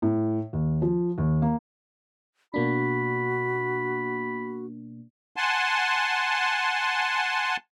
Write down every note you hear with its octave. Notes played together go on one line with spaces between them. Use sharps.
A2
D#2
F3
D#2
A#3
B2 A#3 D4 F#4 B5
F#5 G#5 A5 C6